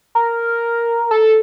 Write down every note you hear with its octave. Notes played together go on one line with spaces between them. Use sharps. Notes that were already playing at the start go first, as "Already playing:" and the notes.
A#4
A4